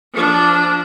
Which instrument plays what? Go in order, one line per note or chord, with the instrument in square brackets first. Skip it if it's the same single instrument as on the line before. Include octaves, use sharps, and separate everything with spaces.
[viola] F3 D4